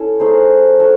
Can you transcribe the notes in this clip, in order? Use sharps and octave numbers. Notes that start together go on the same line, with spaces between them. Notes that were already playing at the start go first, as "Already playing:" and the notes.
Already playing: C#4 E4 A4
A3 D#4 G#4 C5
F#4 A4 C#5